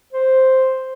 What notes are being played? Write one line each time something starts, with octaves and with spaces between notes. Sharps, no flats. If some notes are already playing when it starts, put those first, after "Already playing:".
C5